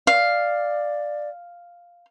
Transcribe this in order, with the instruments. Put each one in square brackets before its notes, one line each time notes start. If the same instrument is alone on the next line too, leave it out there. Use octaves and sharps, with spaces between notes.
[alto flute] D5 [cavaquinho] F5